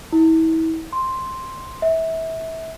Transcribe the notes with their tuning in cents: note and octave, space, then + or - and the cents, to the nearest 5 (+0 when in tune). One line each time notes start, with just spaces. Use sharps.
E4 -35
C6 +5
E5 -25